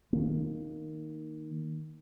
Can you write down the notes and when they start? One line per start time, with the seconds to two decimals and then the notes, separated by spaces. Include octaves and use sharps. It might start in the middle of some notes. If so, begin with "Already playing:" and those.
0.13 D#3 A#3